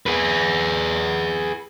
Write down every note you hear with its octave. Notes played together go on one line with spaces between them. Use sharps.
G#4 B4